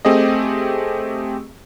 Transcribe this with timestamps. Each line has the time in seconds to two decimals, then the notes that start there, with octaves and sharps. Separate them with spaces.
0.05 A3 C4 G4 G#4 D#5